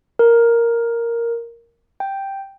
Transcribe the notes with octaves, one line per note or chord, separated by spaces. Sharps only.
A#4
G5